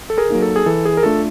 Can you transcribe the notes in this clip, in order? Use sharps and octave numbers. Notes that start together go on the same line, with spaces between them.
A4
G#4 A#4
F#3 A#3 D#4
A4
G#4
E3 A4
G#4
A#4
A3 D4 F4 A4